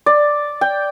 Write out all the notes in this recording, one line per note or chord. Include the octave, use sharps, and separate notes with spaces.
D5
G5